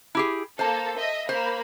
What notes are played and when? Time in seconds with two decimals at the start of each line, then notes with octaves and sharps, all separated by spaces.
0.15 E4 G4 G#4
0.59 A#3 A4 C5 A5
0.98 D#5 E5
1.29 A#3 C5 B5